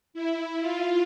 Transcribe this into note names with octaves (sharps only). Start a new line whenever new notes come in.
E4
F4